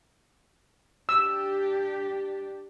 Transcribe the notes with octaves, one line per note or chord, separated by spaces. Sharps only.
D4 G4 E6